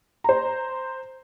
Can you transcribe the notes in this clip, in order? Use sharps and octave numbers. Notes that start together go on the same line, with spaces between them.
C5 A#5